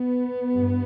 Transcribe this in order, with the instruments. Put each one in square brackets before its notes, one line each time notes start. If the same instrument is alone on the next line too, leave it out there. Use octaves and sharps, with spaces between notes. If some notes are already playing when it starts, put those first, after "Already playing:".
Already playing: [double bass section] B3
G2